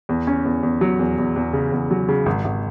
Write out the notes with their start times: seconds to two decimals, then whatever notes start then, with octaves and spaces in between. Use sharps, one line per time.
0.09 E2
0.27 C#4
0.45 E2
0.63 E2
0.81 F#3
0.99 E2
1.18 E2
1.36 E2
1.53 C#3
1.72 E2
1.91 F#3
2.08 C#3
2.26 G#1
2.44 G#1